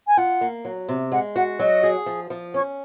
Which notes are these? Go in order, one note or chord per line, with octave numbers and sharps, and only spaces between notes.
G#5
F4 F#5
A#3
F#3
C3
G#3 F#5
F#4 F#5
F#3 D#5
G#4
F3
F3
C#4 C#5